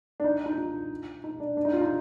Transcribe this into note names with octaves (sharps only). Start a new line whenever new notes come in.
D4
D#4
D#4
F4
D#4
D4
D4
D#4
F4
D#4